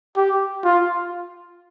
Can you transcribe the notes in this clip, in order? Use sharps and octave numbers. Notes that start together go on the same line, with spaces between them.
G4
F4